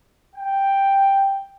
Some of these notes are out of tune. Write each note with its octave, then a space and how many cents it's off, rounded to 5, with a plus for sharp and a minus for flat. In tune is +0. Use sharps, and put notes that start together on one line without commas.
G5 +5